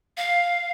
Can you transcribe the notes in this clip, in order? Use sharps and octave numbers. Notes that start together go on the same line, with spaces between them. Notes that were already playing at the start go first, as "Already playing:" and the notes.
F5